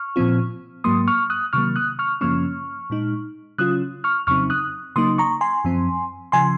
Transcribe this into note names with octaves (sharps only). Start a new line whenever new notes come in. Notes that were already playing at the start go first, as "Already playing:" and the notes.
Already playing: C#6 F6
A#2 F3 C4 F4
G#2 F#3 A#3 C6 D#6
C#6 F6
D#6 F#6
C3 D#3 F#3 A#3 C#6 F6
D#6 F#6
C#6 F6
F#2 C#3 F3 A#3 C#4 C#6 F6
A#2 G#3 D#4
C#3 F#3 C#4 F4 D#6 F#6
C#6 F6
F2 C#3 F#3 C4 D#4 C#6 F6
D#6 F#6
C#3 F#3 A#3 D#4 C6 D#6
A#5 C#6
G#5 C6
F#2 F3 C4
C#3 F3 G#5 C6